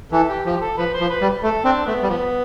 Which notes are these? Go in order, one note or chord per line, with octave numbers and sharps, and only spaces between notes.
E3 A4
G4
F3 G4
A4
F3 B4
C5
F3
B4
G3
A3 A4
C4 D4
A3 B3
G3
F3 B3